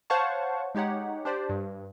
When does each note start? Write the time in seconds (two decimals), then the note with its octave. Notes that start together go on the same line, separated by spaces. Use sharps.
0.10 C5 C#5 F5 F#5 A5 C#6
0.75 G#3 D#4 G4 C#5 F#5
1.25 D4 G4 C5 D5
1.49 G2